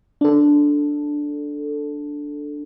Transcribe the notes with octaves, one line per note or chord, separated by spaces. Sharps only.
D4 A4